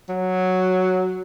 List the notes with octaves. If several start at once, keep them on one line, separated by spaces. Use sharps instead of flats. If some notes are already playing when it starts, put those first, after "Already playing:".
F#3